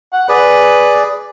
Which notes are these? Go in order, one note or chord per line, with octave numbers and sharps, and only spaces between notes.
F#5
G#4 B4 D5